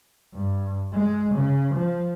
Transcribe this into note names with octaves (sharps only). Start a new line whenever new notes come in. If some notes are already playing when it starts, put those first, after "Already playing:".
G2
G#3
C#3
F3